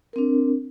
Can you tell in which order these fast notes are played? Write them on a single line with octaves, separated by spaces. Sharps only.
A#4 C4 D4